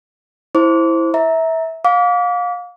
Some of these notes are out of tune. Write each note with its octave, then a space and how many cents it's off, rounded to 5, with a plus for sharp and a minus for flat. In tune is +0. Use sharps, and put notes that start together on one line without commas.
E4 +0 C5 +5 D6 -35
E5 -20 A#5 +0
F5 +30 D6 -35